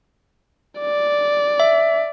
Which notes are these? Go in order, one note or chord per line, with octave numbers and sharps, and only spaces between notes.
D5
E5